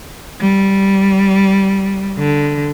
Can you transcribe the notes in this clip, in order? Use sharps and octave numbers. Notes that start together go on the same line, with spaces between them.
G3
D3